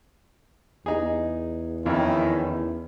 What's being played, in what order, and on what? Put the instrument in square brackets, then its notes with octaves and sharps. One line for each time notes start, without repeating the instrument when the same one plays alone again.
[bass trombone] E2 [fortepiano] D#4 G#4
[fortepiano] F2 [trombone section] D#3 C#4 E4